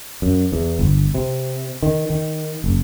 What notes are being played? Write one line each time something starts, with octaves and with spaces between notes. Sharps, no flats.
F#2
E2
G1
C3
D#3
D#3
F#1